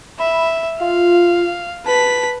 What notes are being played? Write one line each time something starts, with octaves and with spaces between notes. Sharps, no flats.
E5 B5
F4 F5
B4 A5 B6